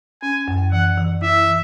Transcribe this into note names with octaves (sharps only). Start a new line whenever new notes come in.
C#4 G#5
F#2
E3 F#5
E3
E4 E5
E3